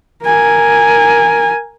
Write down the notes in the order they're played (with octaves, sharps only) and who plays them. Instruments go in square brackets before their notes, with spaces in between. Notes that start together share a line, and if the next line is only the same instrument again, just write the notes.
[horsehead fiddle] A#4 G#5